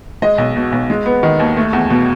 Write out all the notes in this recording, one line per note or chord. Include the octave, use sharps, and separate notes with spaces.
G#3 D#5
B1
B2
B1
G#3
B3
D#3
D#2
A3
E2
B2